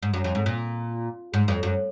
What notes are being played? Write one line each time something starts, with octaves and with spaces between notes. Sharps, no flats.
G#2
F#2
F2
G#2
A#2
G#2
F2
F#2